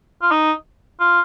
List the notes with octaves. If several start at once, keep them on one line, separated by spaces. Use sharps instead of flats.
F4
D#4
F4